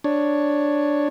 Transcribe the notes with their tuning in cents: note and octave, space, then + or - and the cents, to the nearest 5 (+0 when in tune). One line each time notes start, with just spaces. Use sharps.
D4 +0 C#5 +0